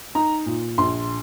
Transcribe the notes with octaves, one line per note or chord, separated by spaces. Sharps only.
D#4 A#5
A#2
A#1 C6